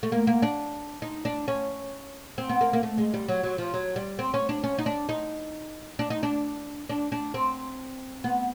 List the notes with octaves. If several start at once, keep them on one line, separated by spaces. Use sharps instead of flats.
A3
A#3
A#3
D4
D#4
D4
C#4
C4
B3
A#3
A#3
A3
G#3
G3
F#3
F#3
F3
F#3
G3
C4
C#4
D4
C#4
D#4
D4
D#4
D4
D#4
D4
D4
D4
C4
B3